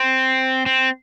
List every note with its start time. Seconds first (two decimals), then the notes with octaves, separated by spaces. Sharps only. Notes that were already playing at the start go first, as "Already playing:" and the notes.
Already playing: C4
0.66 C4